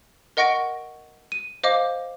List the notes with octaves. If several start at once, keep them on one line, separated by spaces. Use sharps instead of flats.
A#4 D#5 F#5 C#6 A#6 D7
D#7
C5 D#5 F5 D6